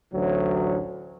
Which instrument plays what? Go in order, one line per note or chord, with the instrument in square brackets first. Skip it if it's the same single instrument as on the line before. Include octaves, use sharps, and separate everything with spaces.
[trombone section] A1 D2 F#3